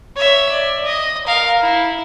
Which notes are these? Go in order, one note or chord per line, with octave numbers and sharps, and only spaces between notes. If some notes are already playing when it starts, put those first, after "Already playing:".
C#5 E5
D5
D#5
A#4 F5
E4